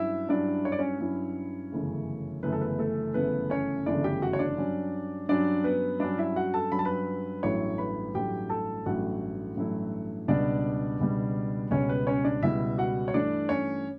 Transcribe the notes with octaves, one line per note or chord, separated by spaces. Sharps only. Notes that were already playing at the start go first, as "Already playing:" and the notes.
Already playing: G2 F#3 C#4 E4 E5
G2 F#3 C#4 D4 E4 D5
C#5
D5
C#4 C#5
G2 F#3 C#4 E4
G1 F#2 C#3 E3 A3
G1 F#2 C#3 E3 A3 B4
A4
B3 B4
A3 A4
G1 F#2 C#3 E3 A3 B3 B4
C#4 C#5
G1 F#2 C#3 E3 A3 D4 D5
G4 G5
F#4 F#5
C#5
D4 D5
G2 F#3 C#4
G2 F#3 C#4 D4 D5
B3 B4
G2 F#3 C#4 D4 D5
E4 E5
F#4 F#5
A4 A5
G2 F#3 C#4 B5
A5
B4 B5
A1 G2 F#3 A3 E4 C#5 C#6
B4 B5
A1 G2 F#3 A3 E4 G4 G5
A4 A5
A1 G2 F#3 A3 E4 F#4 F#5
A1 G2 F#3 A3 E4
C#2 B2 G3 D4 D5
C#2 B2 G3
C#2 B2 G3 C#4 C#5
B3 B4
C#4 C#5
D4 D5
C#2 B2 G3 E4 E5
F#4 F#5
C#5
G2 E3 A3 D4 D5
C#4 C#5